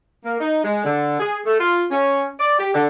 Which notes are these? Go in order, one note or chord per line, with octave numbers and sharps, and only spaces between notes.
A#3
D#4
G#3
D3
G#4
A3
F4
C#4
D5
G4
D3